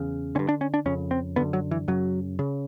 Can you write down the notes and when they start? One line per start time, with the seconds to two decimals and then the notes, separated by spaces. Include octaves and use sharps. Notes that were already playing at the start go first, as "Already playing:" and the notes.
Already playing: E2 C#3
0.35 D3 C#4
0.39 G2
0.49 D4
0.61 C#4
0.74 D4
0.86 F2 C#3 C#4
1.11 C4
1.36 F#2 D3 B3
1.53 F#3
1.71 E3
1.88 F#2 C#3 F#3
2.39 C#3